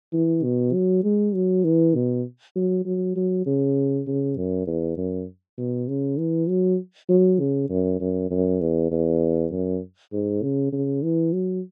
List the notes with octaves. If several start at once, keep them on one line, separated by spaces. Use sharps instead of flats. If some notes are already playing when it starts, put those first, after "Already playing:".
E3
B2
F#3
G#3
F#3
E3
B2
F#3
F#3
F#3
C#3
C#3
F#2
E2
F#2
B2
C#3
E3
F#3
F#3
C#3
F#2
F#2
F#2
E2
E2
F#2
G#2
C#3
C#3
E3
F#3